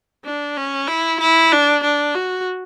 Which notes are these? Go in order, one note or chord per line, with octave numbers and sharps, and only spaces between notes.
D4
C#4
E4
E4
D4
D4
F#4